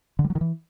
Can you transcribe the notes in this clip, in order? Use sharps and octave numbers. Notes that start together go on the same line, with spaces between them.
D3
G3
F#3
D#3
E3